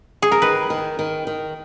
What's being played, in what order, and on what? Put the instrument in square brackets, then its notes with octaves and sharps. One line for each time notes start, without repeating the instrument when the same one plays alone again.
[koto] G#4
A#4
[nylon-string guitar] D#3 [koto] B4
[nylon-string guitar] D#3
D#3
D#3